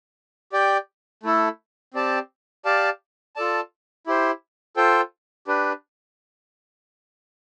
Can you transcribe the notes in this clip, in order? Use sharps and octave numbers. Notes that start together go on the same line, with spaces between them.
G4 D5 G5
A3 E4 A4
C4 G4 D5 A5
G4 D5 F5 A5
F4 A4 D5 A5
E4 G4 C5
F4 A4 C5 G5
D4 G4 B4